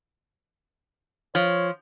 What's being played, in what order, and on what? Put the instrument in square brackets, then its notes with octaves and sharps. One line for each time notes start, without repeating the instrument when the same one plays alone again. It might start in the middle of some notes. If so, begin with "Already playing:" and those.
[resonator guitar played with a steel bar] F3 [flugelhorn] C#5